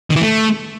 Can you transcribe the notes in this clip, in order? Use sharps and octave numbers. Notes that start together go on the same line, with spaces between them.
D#3
E3
A3